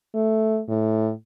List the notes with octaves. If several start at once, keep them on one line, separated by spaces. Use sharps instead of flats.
A3
A2